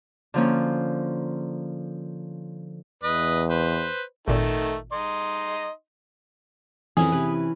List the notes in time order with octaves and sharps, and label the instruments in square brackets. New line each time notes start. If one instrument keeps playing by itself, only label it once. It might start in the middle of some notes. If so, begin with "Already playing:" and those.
[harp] D3 F3 A#3 C#4
[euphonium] E2 [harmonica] B4 D#5
[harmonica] B4 C5
[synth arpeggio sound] G#1 A#2 [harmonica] D#3 A3
[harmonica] D#4 D#5 C6
[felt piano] F2 [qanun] E3 C#4 E4 [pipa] G#4
[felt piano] C3 [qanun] B4